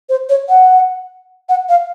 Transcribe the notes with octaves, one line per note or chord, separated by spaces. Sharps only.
C5
C#5
F#5
F#5
F5